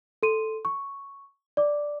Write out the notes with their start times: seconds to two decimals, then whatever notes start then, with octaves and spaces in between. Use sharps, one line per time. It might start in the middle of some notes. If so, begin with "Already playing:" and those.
0.23 A4 C6 D#7
0.65 C#6
1.57 D5 D6